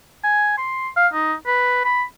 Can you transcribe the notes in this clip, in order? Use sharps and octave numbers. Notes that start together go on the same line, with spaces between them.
G#5
C6
F5
D#4
B4
B5